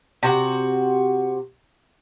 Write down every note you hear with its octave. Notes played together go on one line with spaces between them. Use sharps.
C3 F#4 F#5